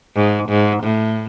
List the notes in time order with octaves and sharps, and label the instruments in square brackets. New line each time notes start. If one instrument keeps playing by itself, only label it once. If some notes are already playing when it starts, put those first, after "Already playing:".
[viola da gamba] G#2
G#2
A2